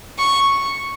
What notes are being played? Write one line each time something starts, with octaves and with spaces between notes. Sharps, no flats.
C#6